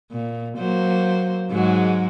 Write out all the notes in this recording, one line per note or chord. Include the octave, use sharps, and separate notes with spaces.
A#2
F#3 A#3 C5
G#2 F#3 G#3